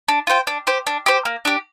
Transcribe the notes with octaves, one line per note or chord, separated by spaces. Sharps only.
D4
F4 C5 G5
D4
G4 C5
D4
G4 C5
A#3
D4 G4